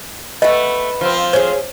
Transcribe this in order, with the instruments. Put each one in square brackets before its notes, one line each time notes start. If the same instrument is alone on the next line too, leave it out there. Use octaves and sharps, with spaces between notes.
[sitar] A3 [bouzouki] B4 F#5 [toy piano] D#5
[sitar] F3 C4
[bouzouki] C#4 G#4 [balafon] C5 C#5